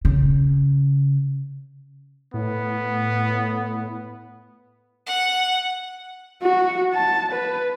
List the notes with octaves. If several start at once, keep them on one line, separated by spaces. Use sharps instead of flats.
C#3
A2 B3
F#5
F#4
A5
B4